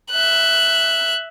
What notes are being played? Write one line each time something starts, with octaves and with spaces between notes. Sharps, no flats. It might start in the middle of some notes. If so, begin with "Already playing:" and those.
E5 F#6